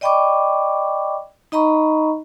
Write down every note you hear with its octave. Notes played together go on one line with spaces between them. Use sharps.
D5 D#5 G5 B5 C#6 D6
D#4 D#5 A#5 B5 C#6